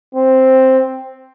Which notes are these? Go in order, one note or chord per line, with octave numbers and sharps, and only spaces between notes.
C4